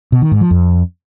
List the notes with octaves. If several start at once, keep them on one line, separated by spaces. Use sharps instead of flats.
B2
D#3
G#2
F3
F2